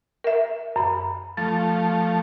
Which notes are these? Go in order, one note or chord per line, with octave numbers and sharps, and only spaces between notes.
A#4 E5
F#2 B5
F3 A3 A6